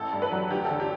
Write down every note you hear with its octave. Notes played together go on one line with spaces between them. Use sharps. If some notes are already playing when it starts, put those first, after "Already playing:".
Already playing: A1 E3 A4
G2
B4
F#3
D2 G4
A4
D3
G4